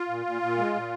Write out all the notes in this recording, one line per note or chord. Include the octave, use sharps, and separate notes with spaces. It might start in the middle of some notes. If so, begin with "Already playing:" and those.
Already playing: F4
A#2
A#2
A#2
G#3
A#2